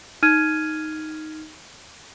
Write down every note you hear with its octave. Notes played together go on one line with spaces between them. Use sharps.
D#4 F6 G#6 D#7